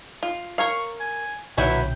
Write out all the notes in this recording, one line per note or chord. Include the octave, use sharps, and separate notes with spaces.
F4
A#4 C#5 F5 C#6
G#5
B1 A#2 D3 E3 F#3 E4 F#4 G5